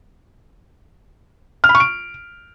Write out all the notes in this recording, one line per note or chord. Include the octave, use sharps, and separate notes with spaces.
F6
B5
C#6
D7